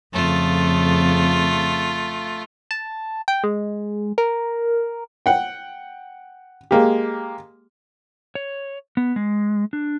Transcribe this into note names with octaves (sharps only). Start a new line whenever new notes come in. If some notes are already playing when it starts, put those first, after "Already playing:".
F2 C#3 A3 F4
A5
G5
G#3
A#4
F#5 G5
G#3 A#3 G4
C#5
B3
G#3
D4